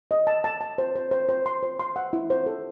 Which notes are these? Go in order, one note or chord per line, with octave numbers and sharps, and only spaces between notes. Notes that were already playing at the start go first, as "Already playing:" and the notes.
D#5
A5
A5
A5
C5
C5
C5
C5
C6
C5
C6
F#5
E4
C5
A4